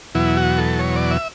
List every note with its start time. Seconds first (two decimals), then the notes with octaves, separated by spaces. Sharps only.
0.15 E2 B2 F#3 E4
0.37 F#4
0.58 A4
0.79 C#5
0.96 D5
1.11 E5